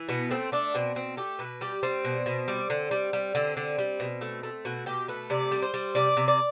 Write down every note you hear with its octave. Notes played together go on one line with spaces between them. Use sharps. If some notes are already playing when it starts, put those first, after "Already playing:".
Already playing: E3
B2 B3
A3 C4
A3 D4
B2 C4
B2 C4
A3 G4
B2 B4
G3 G4
G3 C4
B2
B2
G3
D3
G3
G3
D3 C4
D3
G3
B2
A3
A3
B2 F#4
B2 G4
A3 B4
C3 D5
G3
C5
G3
C3 D5
C3
D5